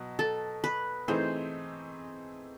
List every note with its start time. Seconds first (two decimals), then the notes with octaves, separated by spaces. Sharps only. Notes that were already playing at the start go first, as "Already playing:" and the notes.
Already playing: B2 F#3
0.19 A4
0.64 B4
1.08 E3 A3 C4 D#4 G#4 C5